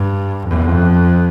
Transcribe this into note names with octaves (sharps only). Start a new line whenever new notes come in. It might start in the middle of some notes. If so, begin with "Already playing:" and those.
Already playing: G2
F2